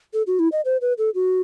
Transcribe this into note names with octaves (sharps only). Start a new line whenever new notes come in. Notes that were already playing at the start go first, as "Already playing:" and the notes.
A4
F#4
E4
D#5
C5
B4
A4
F#4